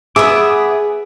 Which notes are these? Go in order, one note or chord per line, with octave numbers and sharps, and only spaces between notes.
B3 G#4 B4 E5 D6 D#6